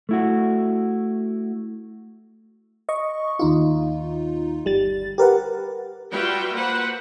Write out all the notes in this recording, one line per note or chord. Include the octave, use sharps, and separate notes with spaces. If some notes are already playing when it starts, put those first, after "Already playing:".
A3 E4 F#4
D#5 C#6
D#2 D#4 F4
G1 G3 A6
G4 A#4 B4 F#5
G3 F4 F#4 B4 E5 G5
A#3 B4 C5 F#5